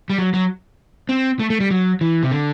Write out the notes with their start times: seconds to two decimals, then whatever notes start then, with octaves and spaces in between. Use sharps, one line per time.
0.10 G3
0.18 F#3
0.34 F#3
1.09 C4
1.40 A3
1.50 A3
1.60 G3
1.71 F#3
2.01 E3
2.23 C3
2.31 D3